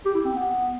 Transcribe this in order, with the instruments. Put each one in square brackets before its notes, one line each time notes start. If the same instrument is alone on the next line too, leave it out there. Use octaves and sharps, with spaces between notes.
[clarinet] G4
E4
C4
B3